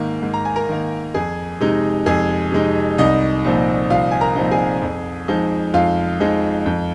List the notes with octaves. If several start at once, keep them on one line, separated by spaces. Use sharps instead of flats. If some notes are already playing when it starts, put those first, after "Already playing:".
Already playing: G#2 D#3 A#3
G#2
A#5
G#5
A#4 A#5
D#3 A#3
F2 G#4 G#5
C3 G#3 D#4
F2 G#4 G#5
C3 G#3 D#4
C2 D#4 D#5
A#2 F3 C4 D#4
C2 F4 F5
G#5
A#4 A#5
A#2 F3 C4 D#4
G#4 G#5
F2
F3 G#3 D#4
F2 F4 F5
F3 G#3 D#4
F2